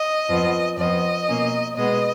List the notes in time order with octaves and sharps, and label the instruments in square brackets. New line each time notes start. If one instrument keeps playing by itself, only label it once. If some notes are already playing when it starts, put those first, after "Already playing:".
Already playing: [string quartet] D#5
F2 F3 B3
F2 F3 B3 D#5
B2 A#3 C#4
B2 G#3 B3 D#5